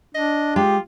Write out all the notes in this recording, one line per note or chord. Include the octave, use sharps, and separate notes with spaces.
D4 D#5
G#3 F4 G4